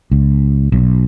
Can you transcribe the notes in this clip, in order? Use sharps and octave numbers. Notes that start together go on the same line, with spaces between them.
C#2
B1